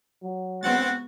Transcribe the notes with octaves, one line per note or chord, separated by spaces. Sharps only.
F#3
G#3 B3 C4 F#4 F#5 A6